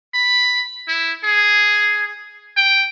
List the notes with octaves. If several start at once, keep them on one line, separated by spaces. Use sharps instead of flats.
B5
E4
G#4
G5